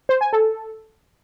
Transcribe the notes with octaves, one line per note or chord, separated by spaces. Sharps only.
C5
G#5
A4